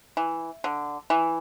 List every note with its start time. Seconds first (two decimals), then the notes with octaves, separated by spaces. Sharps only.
0.17 E3
0.64 D3
1.10 E3